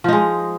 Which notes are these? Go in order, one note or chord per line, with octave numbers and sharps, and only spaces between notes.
F3 G#3 D#4